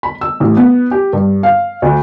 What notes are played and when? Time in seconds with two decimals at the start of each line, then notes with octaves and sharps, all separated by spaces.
0.03 B5
0.21 E6
0.40 A1
0.57 B3
0.91 G4
1.13 G2
1.43 F5
1.82 D2